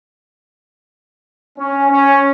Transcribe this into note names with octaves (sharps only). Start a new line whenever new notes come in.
C#4
C#4